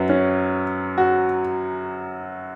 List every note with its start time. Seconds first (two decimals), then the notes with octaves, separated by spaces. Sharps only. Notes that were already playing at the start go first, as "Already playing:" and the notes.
Already playing: F#2 F#3 B4
0.09 C#4
0.98 F#4